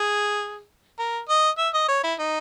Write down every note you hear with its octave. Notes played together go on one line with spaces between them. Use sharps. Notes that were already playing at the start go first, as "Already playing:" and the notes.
Already playing: G#4
A#4
D#5
E5
D#5
C#5
E4
D#4